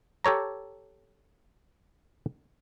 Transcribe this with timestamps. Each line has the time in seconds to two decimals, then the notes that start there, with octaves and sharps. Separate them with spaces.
0.25 G4 A4 C#5 A#5